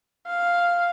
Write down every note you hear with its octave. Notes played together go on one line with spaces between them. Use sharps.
F5